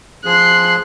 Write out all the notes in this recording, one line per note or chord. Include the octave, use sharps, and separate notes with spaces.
F3 G#4 C6 F#6